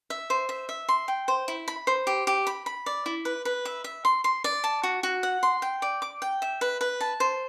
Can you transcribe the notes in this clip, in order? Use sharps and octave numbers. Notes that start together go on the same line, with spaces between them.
E5
C5
E5
E5
C6
G5
C5
E4
B5
C5
G4
G4
B5
B5
D5
E4
B4
B4
E5
E5
C6
C6
D5
A5
F#4
F#4
F#5
C6
G5
D5
D6
G5
E5
B4
B4
A5
C5